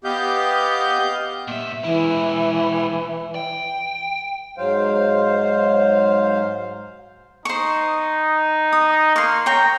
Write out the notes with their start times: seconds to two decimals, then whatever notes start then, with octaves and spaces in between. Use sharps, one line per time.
0.04 B3 G4 D#5 F5 G6
1.48 A#2 E5
1.84 E3 G#3 E4
3.35 G5
4.58 G#2 F#3 C5 F5
7.45 D#4 C5 C#6
8.72 D#6
9.16 A#3 C6 C#6
9.46 C#5 G5 A#5 C#6